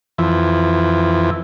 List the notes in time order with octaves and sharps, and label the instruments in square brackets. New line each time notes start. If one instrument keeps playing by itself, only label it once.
[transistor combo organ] F2 E3